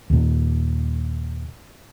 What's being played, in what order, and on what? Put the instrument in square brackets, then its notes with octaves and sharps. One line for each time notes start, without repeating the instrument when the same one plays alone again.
[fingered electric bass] D#2 A#2